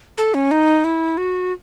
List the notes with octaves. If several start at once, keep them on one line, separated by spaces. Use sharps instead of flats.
A4
C#4
D#4
E4
F#4